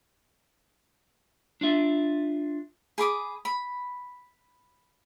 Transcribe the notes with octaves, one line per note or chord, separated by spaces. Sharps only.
D4 F4 E5
G#4 B5 D6 D#6
B5